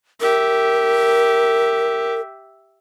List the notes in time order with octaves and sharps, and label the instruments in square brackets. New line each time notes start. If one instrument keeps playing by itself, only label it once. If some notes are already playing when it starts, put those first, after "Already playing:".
[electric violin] G4 E5 [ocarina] A#4